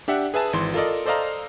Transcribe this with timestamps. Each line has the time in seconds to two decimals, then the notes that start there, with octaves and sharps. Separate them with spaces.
0.08 D4 G4 E5 F#5
0.34 G#4 B4 E5 G#5 A5
0.53 G#1 E3 C6
0.74 F4 A4 A#4 D5 D#5
1.06 A4 C5 D5 D#5 F5 A#5